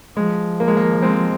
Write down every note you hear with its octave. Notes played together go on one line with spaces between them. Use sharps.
F3 G#3
A#3
G#3
A#3
G#3 C4